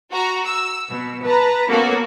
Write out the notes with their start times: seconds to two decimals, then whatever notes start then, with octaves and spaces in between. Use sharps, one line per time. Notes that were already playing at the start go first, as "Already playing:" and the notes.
0.11 F#4 A#5
0.46 E6
0.90 B2
1.25 B4 A5 A#5
1.68 A#3 B3 C#4 F#4 A4